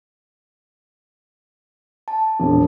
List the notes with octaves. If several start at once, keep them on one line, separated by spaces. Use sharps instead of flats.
A5
E1 A#1